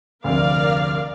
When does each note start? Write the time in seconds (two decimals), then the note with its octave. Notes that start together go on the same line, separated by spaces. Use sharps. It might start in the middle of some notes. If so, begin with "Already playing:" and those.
0.24 F1 D2 A#4 D5 F5